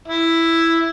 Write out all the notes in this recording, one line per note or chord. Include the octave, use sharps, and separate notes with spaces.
E4